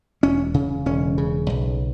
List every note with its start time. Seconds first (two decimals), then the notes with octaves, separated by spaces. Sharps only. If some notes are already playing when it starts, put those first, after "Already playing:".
0.23 E1 C#4
0.54 C#3
0.86 E1 C#4
1.18 C#3
1.50 B1